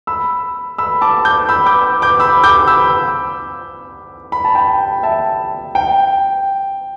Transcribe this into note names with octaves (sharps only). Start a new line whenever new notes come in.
B5 E6
B5 E6
A5 D6
D6 G6
B5 E6
D6 G6
D6 G6
B5 E6
D6 G6
B5 E6
B5
A5
G5 B5
E5 A5
G5